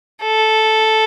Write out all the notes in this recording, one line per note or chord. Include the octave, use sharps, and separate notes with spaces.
A4